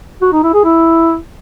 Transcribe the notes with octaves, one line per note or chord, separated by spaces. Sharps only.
F#4
D#4
E4
G#4
E4